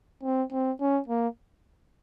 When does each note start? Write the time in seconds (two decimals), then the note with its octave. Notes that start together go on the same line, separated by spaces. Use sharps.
0.23 C4
0.52 C4
0.80 C#4
1.08 A#3